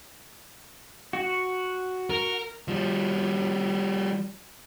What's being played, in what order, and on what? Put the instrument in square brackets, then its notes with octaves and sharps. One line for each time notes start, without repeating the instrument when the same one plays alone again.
[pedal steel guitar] F#4
[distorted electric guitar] A#4
[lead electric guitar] F3 G3